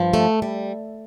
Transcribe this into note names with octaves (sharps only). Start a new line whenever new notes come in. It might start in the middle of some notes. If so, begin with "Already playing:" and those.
Already playing: G2 F3
A3
G3